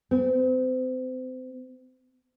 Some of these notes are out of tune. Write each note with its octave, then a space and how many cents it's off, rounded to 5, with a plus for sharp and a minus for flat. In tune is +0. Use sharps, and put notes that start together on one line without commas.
C4 -35